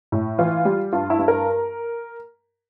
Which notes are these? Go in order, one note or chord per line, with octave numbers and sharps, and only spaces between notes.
A2
E3 F4
G3
G2 F4
E4
G2
A#4